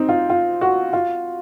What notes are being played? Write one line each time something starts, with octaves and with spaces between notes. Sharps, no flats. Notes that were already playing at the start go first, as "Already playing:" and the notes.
Already playing: C4 D#4
F4
F4
F#4
F4